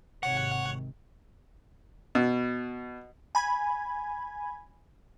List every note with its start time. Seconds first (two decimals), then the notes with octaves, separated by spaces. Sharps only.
0.23 G#1 C3 D#3 C#5 F#5
2.15 B2
3.35 G#5 B5 G#6